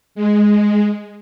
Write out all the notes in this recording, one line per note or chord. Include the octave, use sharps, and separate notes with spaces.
G#3